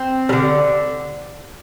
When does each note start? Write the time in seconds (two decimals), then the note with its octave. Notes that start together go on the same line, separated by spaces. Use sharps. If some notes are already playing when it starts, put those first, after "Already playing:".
Already playing: C4
0.29 G3
0.32 D3